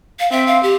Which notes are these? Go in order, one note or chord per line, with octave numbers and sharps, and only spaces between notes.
F5
C4 E5
F5
G4